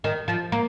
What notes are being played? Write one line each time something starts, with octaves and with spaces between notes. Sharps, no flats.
D#3
F3
A#3